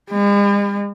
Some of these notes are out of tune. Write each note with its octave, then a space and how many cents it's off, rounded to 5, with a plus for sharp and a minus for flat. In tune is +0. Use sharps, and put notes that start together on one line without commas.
G#3 -45